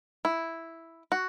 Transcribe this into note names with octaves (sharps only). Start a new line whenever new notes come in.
E4
F#4